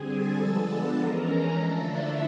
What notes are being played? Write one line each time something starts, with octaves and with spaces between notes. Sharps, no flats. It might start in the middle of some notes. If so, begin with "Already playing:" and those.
Already playing: D3 G3 C4 G#4 G#5
A4 A5
F3 G#3 B3 D4
E3 G#3 C#4 A#4 A#5
D3 F3 A3 D4 A4 A5
E4 E5